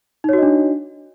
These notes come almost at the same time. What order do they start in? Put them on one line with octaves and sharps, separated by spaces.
D#4 C#5 F#4 D#5 D4